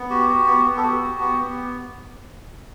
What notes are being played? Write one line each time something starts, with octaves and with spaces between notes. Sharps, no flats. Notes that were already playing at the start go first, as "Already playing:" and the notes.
Already playing: B3
F#4 G4
F#4
B3
B3
A4
F#4 G4
F#4
B3
B3